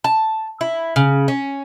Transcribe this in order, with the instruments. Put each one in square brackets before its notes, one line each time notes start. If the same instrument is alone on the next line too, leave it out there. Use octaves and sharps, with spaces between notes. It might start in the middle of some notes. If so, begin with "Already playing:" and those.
[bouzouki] A5
E4
C#3
C#4